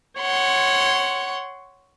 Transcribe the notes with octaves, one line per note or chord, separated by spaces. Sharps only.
C#5 F#5 C6